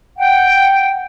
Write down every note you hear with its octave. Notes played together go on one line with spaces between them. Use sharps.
F#5 G5